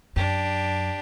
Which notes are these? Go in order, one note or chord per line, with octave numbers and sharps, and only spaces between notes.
F#2 D4 G4